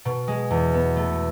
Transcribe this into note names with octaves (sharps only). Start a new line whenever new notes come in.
B2
G#3
E2
B3
A3